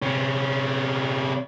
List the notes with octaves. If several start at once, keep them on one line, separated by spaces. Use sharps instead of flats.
C3 C#4